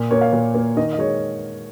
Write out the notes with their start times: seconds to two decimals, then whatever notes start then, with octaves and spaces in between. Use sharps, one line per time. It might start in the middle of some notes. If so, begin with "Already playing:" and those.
Already playing: A#2
0.11 A#3 C#5
0.21 F5
0.33 A#2
0.54 A#3
0.77 D#3 D#5
0.93 D#5
0.99 G#3 C#5